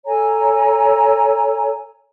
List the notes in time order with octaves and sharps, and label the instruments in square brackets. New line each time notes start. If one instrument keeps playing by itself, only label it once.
[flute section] A4 C#5 G#5 A#5